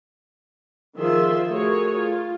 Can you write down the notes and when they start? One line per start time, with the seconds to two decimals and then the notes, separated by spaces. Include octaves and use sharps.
0.97 D#3 F3 F4 G#4 E5 C6
1.48 A3 F#4 G#4 A#4 C#5
1.98 F4